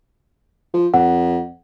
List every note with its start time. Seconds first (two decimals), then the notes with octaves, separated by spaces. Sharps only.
0.74 F3
0.94 F2 F#5